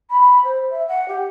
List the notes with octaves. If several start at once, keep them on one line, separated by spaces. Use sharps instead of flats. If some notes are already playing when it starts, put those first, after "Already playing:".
B5
C5
E5
F#5
G4